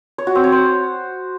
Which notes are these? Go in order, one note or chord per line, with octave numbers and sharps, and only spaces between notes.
C#5
F#4
C4
C#5
C5